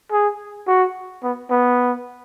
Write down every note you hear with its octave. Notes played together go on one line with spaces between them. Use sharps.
G#4
F#4
B3
B3